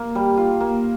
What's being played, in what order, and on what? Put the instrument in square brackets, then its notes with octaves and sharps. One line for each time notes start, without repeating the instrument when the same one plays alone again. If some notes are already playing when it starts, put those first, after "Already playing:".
Already playing: [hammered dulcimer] A#3
G3
F4
A#3